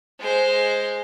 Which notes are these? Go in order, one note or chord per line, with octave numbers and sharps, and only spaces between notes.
G#3 C5